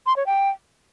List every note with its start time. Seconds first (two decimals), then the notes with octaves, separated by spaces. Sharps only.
0.06 C6
0.16 C#5
0.26 G5